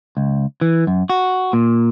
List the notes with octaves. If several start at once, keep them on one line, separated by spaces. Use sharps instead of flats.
C#2
E3
F#2
F#4
A#2